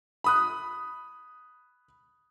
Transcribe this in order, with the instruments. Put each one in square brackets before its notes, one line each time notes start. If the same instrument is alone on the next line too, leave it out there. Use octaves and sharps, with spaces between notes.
[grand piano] B5 D#6 F#6